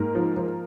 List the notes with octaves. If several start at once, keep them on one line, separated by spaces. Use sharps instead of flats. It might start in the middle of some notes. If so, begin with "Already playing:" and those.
Already playing: G#2 A#3 A#4
F3
F3